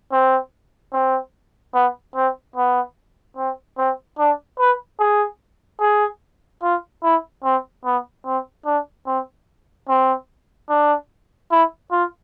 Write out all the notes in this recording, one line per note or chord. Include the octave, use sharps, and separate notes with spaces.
C4
C4
B3
C4
B3
C4
C4
D4
B4
G#4
G#4
F4
E4
C4
B3
C4
D4
C4
C4
D4
E4
F4